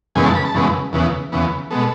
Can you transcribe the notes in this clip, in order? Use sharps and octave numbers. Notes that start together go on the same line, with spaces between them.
F#2 C#3 E3 G#3 B3 G#5
A5
B5
A5
F#2 C#3 E3 G#3 B3
E2 C#3 E3 B3
E2 C#3 E3 B3
B2 G#3 B3 A4